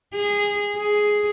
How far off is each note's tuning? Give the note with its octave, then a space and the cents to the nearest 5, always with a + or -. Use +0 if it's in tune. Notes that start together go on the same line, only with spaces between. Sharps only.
G#4 -20
G#4 +5